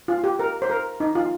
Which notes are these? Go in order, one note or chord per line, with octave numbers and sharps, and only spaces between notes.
F4
G4
A#4
C5
A#4
D#4
F4